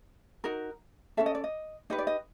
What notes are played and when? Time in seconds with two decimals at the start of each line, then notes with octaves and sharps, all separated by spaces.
0.44 D#4 F#4 A#4
1.17 C#4 F4 A4 E5
1.26 D#5
1.35 D5
1.44 D#5
1.90 D#4 G4 B4 D#5
1.98 D5
2.07 D#5